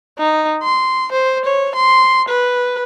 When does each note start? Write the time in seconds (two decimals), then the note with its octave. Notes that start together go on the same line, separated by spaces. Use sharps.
0.19 D#4
0.63 C6
1.12 C5
1.45 C#5
1.75 C6
2.29 B4